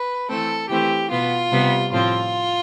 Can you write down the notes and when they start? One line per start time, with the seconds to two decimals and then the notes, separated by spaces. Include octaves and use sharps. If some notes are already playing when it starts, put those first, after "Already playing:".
Already playing: B4
0.28 E3 A3 C4 A4
0.69 E3 A3 C4 G4
1.10 B2 B3 F4
1.51 C3 G3 B3
1.92 A2 F3 C4 F4